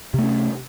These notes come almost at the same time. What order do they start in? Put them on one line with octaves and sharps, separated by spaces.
C3 A3 C#4